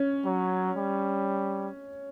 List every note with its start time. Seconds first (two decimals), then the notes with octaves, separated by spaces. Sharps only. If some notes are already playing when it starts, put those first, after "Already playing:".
Already playing: C#4
0.25 F#3
0.77 G3